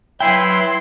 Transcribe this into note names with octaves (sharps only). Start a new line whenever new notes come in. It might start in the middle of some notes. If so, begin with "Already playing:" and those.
F#3 E4 B4 E5 F#5 G5 C6